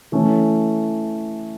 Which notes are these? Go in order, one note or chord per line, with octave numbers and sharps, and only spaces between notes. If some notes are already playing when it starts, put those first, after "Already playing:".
E3 A3 C#4